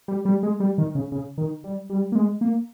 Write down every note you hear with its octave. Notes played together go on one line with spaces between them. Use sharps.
G3
G3
G#3
G3
D#3
C#3
C#3
D#3
G3
G3
A#3
G#3
A#3